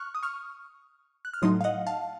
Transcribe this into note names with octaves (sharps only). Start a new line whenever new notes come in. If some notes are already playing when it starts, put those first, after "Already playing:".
Already playing: C#6 F6 F#6
D#6
C#6 F6
F#6
F6
A2 F#3 A3 D#4 C6 D#6
F5
D#5 F#5
F5 A5